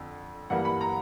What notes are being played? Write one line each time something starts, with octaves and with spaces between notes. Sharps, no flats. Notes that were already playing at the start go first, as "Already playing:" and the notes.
Already playing: F2 D3
G2 E3 G3 A#3 F#5
B5
A#5